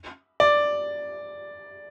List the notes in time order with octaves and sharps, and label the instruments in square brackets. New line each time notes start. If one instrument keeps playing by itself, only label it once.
[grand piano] D5